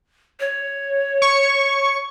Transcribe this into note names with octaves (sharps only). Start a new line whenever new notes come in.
C#5
C#6